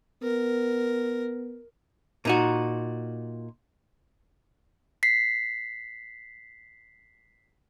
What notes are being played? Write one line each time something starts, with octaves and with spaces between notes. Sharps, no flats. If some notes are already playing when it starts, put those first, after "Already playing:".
B3 A#4
A#2 D#4 F#4
B6 C7